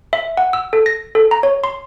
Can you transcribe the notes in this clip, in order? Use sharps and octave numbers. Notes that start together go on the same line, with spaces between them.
E5
F#5
E6
A4
A#6
A4
A#5
C#5
C6